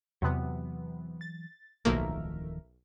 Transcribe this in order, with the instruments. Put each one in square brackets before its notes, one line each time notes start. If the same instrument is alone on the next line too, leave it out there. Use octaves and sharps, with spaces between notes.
[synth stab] E2 C3 B3 [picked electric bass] E3 F#3
[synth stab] A6
[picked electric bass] D1 D#3 F3 [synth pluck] B1 A#3 [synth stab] A3 A#4 E5